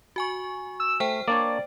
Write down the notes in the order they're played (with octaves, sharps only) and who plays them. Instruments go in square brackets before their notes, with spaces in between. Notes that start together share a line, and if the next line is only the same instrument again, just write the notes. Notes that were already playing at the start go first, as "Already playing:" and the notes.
[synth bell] F#4 G#5 C#6
[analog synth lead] E6
[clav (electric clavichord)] A3 [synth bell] C5 G5 [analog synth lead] B6
[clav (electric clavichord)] A#3 D4 C#5 [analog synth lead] D5